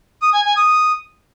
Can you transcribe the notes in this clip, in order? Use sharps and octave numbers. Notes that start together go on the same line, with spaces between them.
D#6
G#5
G#5
D#6